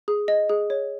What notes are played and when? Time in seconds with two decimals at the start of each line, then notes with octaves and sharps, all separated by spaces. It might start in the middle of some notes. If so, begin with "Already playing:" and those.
0.08 G#4
0.28 D#5
0.49 G#4
0.70 C#5